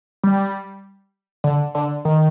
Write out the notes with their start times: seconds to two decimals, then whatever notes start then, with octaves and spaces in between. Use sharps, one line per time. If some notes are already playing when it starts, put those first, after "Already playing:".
0.24 G3
1.44 D3
1.75 D3
2.05 D#3